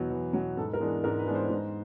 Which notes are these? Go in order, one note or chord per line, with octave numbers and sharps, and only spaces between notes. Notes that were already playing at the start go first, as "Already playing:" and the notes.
Already playing: E2 B2 F#3
E2
B2 F#3
G#2 A4
A#4
E3 G#3 B3 D4
G#2 A#4
B4
E3 G#3 B3 D4
C5
G#2